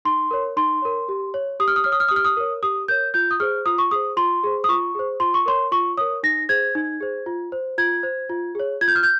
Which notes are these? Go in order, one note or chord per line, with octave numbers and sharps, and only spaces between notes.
D#4 C6
A#4 C#5
D#4 C6
A#4 C#5
G4
C#5
G4 D#6
F6
D#6
C#5 F6
D#6
F6
G4 D#6
F6
D#6
A#4 C#5
G4 D#6
A#4 C#5 G6
F4 G6
D#6
G#4 C5 F6
F4 D#6
C#6
G#4 C5 D#6
F4 C6
G#4 C5
D#6
F4 C#6
G#4 C5
F4 C6
C#6
A#4 C#5 C6
F4 C#6
A#4 C#5 D#6
D#4 A#6
G#4 C5 G#6
D#4
G#4 C5
F4
C5
F4 G#6
C5
F4
G#4 C#5
F4 G#6
G6
F6
G6